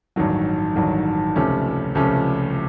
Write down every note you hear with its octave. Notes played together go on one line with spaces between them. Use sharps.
A1 G2 D#3 F#3
A1 G2 D#3 F#3
C#2 C3 F3 A3 C#4
C#2 C3 F3 A3 C#4